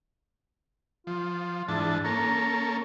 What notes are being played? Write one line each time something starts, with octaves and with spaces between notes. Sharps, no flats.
F3 F4
G#2 E3 D4 A5
A#3 C#4 A4 A#5